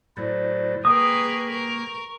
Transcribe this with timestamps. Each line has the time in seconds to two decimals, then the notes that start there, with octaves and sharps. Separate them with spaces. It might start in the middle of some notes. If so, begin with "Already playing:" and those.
0.17 A2 F#3 E4 C5 D5
0.85 A#3 G#4 A#4 B4 G5 C#6 D#6
1.50 A#4